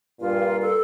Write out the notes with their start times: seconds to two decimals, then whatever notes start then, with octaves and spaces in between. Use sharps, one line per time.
0.20 G2 A#2 F4
0.62 A4